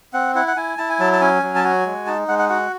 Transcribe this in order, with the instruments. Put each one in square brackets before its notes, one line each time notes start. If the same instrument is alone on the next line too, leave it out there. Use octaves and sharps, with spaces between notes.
[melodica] C4 F#5
E4 F#5
F#5
E4 G#5
E4 A5
G#5
F#3 A5
A5
C#4 G#5
F#3
A5
F#4 G#5
G#3
D#4 A5
G#3 F#5
F#5
F#4 F#5